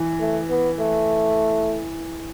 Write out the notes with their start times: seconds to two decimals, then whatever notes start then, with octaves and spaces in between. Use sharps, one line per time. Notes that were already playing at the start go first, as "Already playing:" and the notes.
Already playing: E3
0.20 A3
0.50 B3
0.79 A3